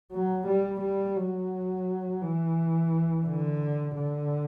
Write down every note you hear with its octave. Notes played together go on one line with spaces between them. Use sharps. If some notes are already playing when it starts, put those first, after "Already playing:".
F#3
G3
G3
F#3
E3
D3
D3